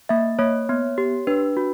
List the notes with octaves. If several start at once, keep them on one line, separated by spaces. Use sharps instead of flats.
A#3 E5
A#3 C#5
B3
G4
D4 B4
F#4